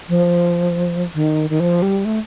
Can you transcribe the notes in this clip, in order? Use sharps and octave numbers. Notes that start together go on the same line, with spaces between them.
F3
D#3
D#3
F3
G3
A3